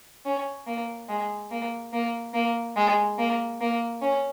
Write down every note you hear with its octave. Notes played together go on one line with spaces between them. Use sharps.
C#4
A#3
G#3
A#3
A#3
A#3
G#3
A#3
A#3
C#4